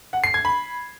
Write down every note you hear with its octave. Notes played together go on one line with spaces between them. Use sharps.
F#5
C7
G#6
B5